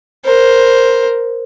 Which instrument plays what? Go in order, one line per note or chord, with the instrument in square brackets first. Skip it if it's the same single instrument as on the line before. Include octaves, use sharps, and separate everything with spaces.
[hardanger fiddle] A#4 C5